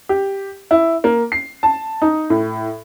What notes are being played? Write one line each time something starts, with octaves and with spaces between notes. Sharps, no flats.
G4
E4
A#3
C7
A5
D#4
A2